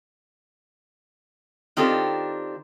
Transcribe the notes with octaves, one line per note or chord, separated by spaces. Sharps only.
D#3 C4 D4 F4 G4 A4